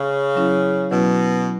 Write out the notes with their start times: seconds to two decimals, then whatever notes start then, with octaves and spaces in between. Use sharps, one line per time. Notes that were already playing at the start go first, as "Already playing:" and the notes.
Already playing: C#3
0.35 F#3 C#4 E4
0.91 B2 F#3 C#4 E4